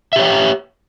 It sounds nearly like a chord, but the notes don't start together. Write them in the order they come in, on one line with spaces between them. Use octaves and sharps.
E5 G4 C#5 G5